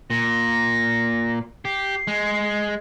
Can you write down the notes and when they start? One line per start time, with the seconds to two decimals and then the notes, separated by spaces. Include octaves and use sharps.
0.10 A#2 A#6
1.65 G4 C7
2.07 G#3